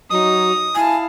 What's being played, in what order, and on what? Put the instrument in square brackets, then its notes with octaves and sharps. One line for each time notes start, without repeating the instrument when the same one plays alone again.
[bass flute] F#3 [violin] D#4 [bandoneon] D#6
[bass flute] E4 [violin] F5 A5 [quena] G#5